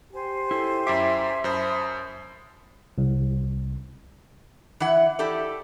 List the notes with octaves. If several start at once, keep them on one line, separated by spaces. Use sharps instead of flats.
G4 C5 G#5
E4 A4
F#2 E4 E5 D6
F#2 C5 A5 B5 D#6
C2
E3 E4 F#5
E4 G4 A4 D5